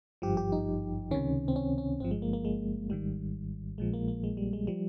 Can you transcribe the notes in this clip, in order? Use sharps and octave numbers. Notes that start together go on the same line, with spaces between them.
G#1 G2 F3 G4
G4
D#4
C#2 C3 D#3 C#4
C4
C#4
C#4
G1 G2 F3 C4
G#3
A#3
A#3
G#3
G#1 G#2 D#3 G3
A#1 A#2 F3 G#3
A#3
A#3
G#3
G3
G#3
F3 G3